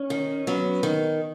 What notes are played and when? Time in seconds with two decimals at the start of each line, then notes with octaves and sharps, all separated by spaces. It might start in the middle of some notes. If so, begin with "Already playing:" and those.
Already playing: C#4
0.10 D#3
0.47 F#3 B3
0.83 D#3